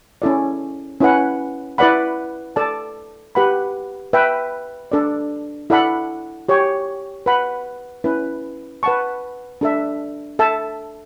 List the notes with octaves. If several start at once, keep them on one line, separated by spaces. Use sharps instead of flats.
C#4 E4 A4 D5
C#4 E4 B4 F#5
E4 B4 D5 F#5 B5
A4 D5 A5
G4 B4 F#5 B5
B4 E5 G5
D4 A4 D5
E4 A4 D5 F#5 B5
G4 C#5 G5
B4 F#5 B5
C#4 E4 B4
B4 F#5 A5 C#6
D4 A4 E5
A4 E5 A5